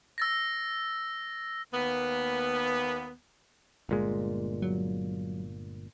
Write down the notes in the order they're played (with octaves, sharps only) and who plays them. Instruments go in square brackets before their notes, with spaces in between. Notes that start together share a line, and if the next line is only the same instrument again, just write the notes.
[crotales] E6 A6 A#6
[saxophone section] D#2 A#3 B3
[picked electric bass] G1 A#2 G#3
[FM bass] F#3